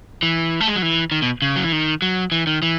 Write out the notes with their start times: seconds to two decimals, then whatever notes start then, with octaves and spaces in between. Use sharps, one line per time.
0.23 E3
0.61 A3
0.68 G#3
0.76 F#3
0.82 E3
1.12 D#3
1.22 B2
1.42 C#3
1.56 F#3
1.64 E3
1.72 D#3
2.02 F#3
2.32 E3
2.47 D#3
2.62 E3